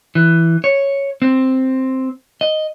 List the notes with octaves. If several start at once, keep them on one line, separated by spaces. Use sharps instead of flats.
E3
C#5
C4
D#5